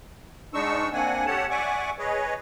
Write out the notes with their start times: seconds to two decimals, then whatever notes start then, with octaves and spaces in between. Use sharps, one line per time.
0.54 G#2 G#3 D4 D#4 C#6 E6
0.93 A#3 C4 D4 F#5 G#5
1.26 G4 A4 C#5 F#5 A5
1.50 D5 E5 F#5 G#5 C#6 D6
1.99 G#4 B4 C#5 D#5